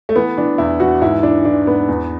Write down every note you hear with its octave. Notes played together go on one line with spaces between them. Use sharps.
A3
E3 B3
E3 D4
E2 E4
E3 F#4
G#2 E4
E3 D4
E3 D4
G#2 B3
E2